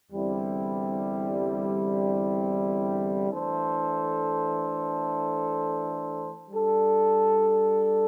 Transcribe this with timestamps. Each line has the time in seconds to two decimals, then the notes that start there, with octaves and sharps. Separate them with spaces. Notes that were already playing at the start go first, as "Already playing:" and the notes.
0.11 E2 D3 G3 C4 E4
3.31 E3 A3 D4 A4 C5
6.50 G3 D4 A4